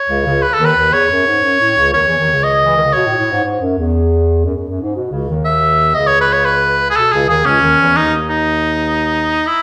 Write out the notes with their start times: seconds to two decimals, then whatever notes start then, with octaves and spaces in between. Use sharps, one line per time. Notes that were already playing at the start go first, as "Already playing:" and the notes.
Already playing: C#5
0.09 C#2 C#3
0.26 C#2 C#3
0.43 B4
0.53 A4
0.59 D#2 D#3
0.65 B4
0.76 D#2 D#3
0.93 E2 C#5
1.10 F#2
1.27 G#2
1.43 F#2
1.60 A2
1.76 C#2 C#3
1.93 D#2 D#3 C#5
2.06 E2 E3
2.18 D#2 D#3
2.30 C#2 C#3
2.44 D#5
2.66 E3
2.75 D#3
2.85 C#3
2.93 B2 C#5
3.06 A2
3.18 A2
3.31 G#2
3.44 G#2
3.61 F#2
3.78 E2
4.45 F#2
4.57 F#2
4.69 F#2
4.82 G#2
4.95 B2
5.11 C#2 C#3
5.29 D#2 D#3
5.45 E5
5.95 C#2 C#3 D#5
6.07 C#5
6.21 B4
6.33 C#5
6.45 B4
6.90 G#4
6.96 B2 A4
7.12 C#2 C#3 G#4
7.29 D#2 D#3 G#4
7.45 C#2 C#3 C#4
7.62 D#2 D#3
7.79 E2 E3
7.96 D#2 D#3 D#4
8.30 D#4
9.47 E4